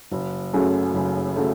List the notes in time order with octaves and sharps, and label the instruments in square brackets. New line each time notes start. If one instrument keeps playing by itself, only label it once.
[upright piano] F#1
F#2 C#3 F#3 A3
F#1
C#3 F#3 A3